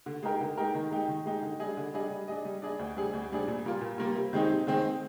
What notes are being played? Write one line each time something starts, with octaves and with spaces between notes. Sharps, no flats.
D3
G#3 D#4 G4 A#4
D3
G#3 D#4 G4 A#4
D#3
G#3 D#4 G4
D#3
G#3 D#4 G4
D3
G3 D4 G#4 D#5
D3
G3 D4 G#4 D#5
G3
D4 G#4 D#5
G3
D4 G#4 D#5
D2
C3 G3 D4 G#4
D2
C3 G3 D4 G#4
A#2
G3 A#3 F4
A#2
G3 A#3 F4
C3
D#3 G#3 C4 D#4
C3
D#3 G#3 C4 D#4